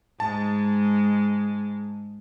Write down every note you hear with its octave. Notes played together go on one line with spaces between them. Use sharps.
G#2 G#3 A5